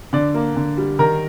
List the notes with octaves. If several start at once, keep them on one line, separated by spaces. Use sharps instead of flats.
D3 D5
A#3
D3
G3
D#3 A#4